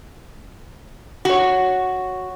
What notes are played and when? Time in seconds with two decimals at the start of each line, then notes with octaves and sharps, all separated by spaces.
1.25 F#4 C#5